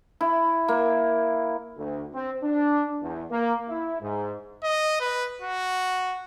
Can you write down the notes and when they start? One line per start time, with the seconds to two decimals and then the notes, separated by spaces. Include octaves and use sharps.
0.21 E4
0.68 A#3
1.77 D2
2.14 C4
2.44 D4
3.02 E2
3.31 A#3
3.69 E4
4.01 G#2
4.63 D#5
5.00 B4
5.42 F#4